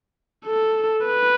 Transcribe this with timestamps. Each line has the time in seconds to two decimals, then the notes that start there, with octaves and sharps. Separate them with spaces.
0.46 A4
1.07 B4